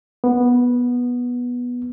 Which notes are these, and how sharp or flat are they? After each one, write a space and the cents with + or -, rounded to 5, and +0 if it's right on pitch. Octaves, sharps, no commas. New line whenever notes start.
B3 -10